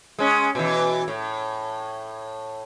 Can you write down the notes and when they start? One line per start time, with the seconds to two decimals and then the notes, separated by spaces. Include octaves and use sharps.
0.19 G#3 C#4
0.55 B2 E3
1.08 A2